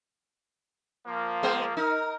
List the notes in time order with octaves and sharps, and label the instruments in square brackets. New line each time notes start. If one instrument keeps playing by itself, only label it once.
[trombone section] F3 A#3
[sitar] G#3 B3 C5
[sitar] D#4 [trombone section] A#4